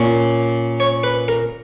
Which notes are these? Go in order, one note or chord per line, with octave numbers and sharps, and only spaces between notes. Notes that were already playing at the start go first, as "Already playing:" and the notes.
Already playing: A#2 A#3 C#4
C#5
B4
A#4